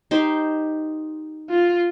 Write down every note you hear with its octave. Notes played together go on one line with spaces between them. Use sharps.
D#4 G4 C5
F4